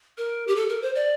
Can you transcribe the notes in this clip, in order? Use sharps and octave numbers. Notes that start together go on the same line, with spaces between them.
A#4
G4
A4
A#4
C5
D5